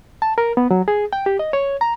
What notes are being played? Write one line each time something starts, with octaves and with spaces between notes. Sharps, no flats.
A5
A#4
B3
F#3
G#4
G5
G4
D#5
C#5
A#5